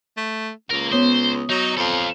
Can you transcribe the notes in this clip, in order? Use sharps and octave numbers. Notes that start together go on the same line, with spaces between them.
A3
C#2 A#3 A#4
B3 C5 C#5 D#6
F#3 D#4
F2 A4 F5